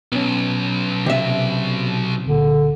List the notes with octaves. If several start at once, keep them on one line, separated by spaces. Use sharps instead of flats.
B1 B3 C#4
C3 E5
C#2 A#2 D3